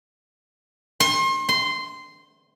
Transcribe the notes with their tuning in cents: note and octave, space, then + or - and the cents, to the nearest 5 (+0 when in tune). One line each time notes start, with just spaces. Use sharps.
C6 +35
C6 -10